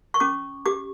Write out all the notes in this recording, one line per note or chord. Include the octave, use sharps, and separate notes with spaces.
C#6
C#4 D6
G4 D6